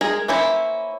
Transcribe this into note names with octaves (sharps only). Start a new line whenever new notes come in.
G#3 G#4 A#4
A#3 C#4 E4 C5